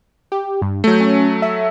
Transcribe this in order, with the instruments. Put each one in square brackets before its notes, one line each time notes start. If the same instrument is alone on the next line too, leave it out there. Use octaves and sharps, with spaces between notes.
[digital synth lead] G4
G2
[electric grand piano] F#3 A3 [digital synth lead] G6
[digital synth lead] C#4
E5